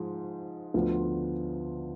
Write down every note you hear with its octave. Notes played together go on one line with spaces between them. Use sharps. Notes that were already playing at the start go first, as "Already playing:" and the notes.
Already playing: G#2 F3
D2 D3 F3 B3 F4